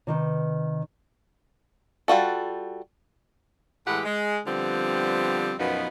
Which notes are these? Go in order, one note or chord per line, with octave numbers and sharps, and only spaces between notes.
C3 D#3 B4
G3 F4 F#4 A4
A2 E3 G#3 G4 F#5
G#3
D3 F3 G3 B3 C4
F#2 B2 F3 B3 D#4